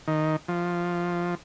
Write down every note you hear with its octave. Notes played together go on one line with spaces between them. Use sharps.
D#3
F3